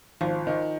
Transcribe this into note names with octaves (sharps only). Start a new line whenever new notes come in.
G#1 F3
D#3